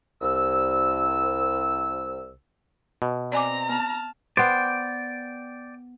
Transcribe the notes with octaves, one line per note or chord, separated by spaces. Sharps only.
C2 E6
B2
C4 D5 G#5 A#5 D6
B3 A5 F6
B3 C5 D5 G5